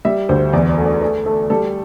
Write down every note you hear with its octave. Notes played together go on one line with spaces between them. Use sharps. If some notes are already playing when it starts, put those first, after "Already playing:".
G3 E5
D2 C5
E2 D5
D5
A3
D5
A3 D5
A3 A4
G3 A4